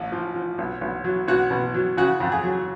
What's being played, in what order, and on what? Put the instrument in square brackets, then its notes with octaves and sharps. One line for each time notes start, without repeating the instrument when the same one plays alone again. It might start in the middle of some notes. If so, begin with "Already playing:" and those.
Already playing: [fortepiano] A1
F3
F3
B1
B1
F#3
B1 F#4
B2
F#3
C#3 F#4
F2
G#4
F#3